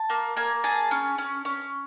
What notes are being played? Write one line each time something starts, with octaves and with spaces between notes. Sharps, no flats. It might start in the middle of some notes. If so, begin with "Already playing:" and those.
Already playing: A5
A#3
A#3 G#5
G#4 A5
C#4
C#4
C#4